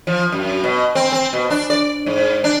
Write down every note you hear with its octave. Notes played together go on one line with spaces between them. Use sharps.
F3
F#2
B2
C4
C4
B2
D4
D5
G#2
D4